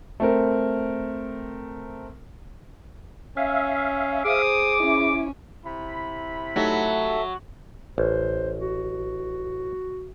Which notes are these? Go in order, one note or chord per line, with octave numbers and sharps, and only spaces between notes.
A3 C4 A#4
C#4 E5 F5
G#4 C5 D6 D#6
C#4 E4
C3 E4 B5
F#3 A3 D#4 G4 A4 E5
A1 C5
F#4